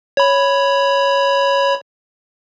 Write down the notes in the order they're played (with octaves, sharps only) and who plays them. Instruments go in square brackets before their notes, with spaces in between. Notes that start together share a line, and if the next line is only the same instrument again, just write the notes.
[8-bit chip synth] C#5 B5